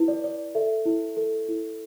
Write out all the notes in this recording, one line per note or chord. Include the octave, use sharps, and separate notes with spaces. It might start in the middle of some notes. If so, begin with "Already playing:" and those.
Already playing: E4 B4
D5
D5
A4 E5
E4
A4
E4